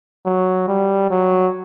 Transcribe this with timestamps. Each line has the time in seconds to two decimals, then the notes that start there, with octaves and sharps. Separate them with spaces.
0.26 F#3
0.68 G3
1.10 F#3